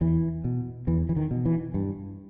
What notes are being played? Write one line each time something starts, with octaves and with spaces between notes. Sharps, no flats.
E2 E3
B2
E2 E3
E3
D#3
B2
E3
G2